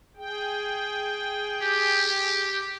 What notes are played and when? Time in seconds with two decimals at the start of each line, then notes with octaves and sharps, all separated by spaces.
0.17 G#4 G5
1.62 G4